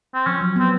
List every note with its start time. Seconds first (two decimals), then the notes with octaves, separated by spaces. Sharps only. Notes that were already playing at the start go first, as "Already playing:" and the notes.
0.14 C4
0.26 F3 C#4
0.41 F#3
0.56 B3
0.59 C4